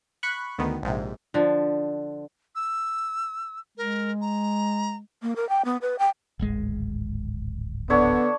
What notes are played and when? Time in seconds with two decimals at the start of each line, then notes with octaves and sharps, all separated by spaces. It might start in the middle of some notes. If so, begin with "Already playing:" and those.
0.23 B5 C#6 F#6
0.58 D2 D#3 B3
0.83 A#1 G#2 C3
1.34 D3 F3
2.55 E6
3.78 G#3 A#4
4.21 A#5
5.22 A#3
5.36 A#4
5.49 G5
5.65 B3
5.82 B4
5.99 G5
6.39 D1 G#1 G#3
7.90 D3 B3 D4 C#5 E5